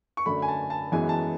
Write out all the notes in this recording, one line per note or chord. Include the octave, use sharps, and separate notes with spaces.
C#6
F#2 D3 A3 B5
G#5
A5
A5
F#2 E3 G#3 B3 G#5
A5